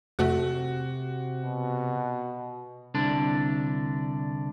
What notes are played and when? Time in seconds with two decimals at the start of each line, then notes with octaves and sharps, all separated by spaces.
0.19 F2 C3 A3 F#4
1.43 B2
2.94 C2 D3 D4